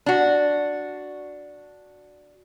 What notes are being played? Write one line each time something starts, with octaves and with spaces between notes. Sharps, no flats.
D4 F#4